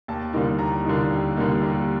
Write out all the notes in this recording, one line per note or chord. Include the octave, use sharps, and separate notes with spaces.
D#2 A5
D3 G3 A#3 D#4
D#2 A#5
D3 G3 A#3 D#4
D#2
D3 G3 A#3 D#4
D#2